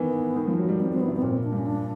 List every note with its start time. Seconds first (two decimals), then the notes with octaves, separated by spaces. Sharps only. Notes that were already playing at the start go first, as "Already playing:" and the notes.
Already playing: D#3 E3 B3
0.36 D#3
0.47 F3
0.58 F#3
0.69 G3
0.80 G3 C4
0.92 F#3 C4
1.01 B3
1.08 C3
1.16 B3
1.22 A#2 C4
1.44 D4
1.52 G2
1.58 C#4
1.66 D4